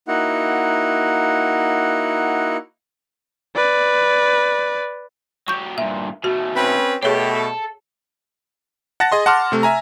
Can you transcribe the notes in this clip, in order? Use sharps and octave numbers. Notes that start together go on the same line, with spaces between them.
A#3 D#4 E4 F#4 F#5
B4 D5
F#3 G4 C#6 G6
G2 A#2 E5
B2 A3 F#4
C4 C#4 B4
B2 A3 G4 G#4 C#5
A4
F#5 A5 A6 A#6
G#4 D#5 C6
F#5 A5 C6 D6 F6
C3 A3 A4
E5 G#5 A#5